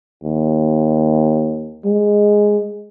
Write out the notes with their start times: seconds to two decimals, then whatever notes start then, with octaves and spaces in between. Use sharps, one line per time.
0.23 D#2
1.85 G#3